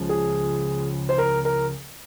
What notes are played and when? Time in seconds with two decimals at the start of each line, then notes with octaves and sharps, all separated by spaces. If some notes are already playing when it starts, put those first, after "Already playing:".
Already playing: C#2 C#3 F3
0.09 G#4
1.09 C5
1.18 A#4
1.45 A#4